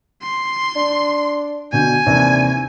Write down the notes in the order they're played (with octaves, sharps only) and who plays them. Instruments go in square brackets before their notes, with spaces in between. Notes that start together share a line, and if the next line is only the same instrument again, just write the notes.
[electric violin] C6
[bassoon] D4
[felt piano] B2 D3 G6 [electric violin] G#5
[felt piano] D#2 C3 E3 [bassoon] D4